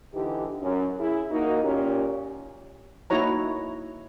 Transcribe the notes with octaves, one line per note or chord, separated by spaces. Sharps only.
G#2 D3 E3 D#4 G4
F#2
E4 G#4
A#3 D#4 F#4
A#2 C#4 G4
A#3 D#4 E4 F#4 C#5 A#5